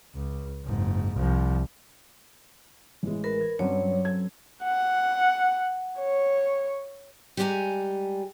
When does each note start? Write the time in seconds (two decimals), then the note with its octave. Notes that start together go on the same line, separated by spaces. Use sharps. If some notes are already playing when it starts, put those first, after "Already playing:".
0.15 C#2
0.66 F#1 G#2
1.15 C2 F3
3.03 A1 E3 G#3
3.24 A#4 B4
3.41 G#6
3.59 G2 F#3 C4 C#4 C#5
4.05 A4 G#6
4.64 F#5
5.99 C#5
7.37 G3 G#3 G4 F#5 G#5 A#5